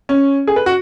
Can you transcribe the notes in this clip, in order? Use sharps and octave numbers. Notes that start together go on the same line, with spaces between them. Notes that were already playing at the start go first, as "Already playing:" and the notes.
C#4
G#4
B4
F#4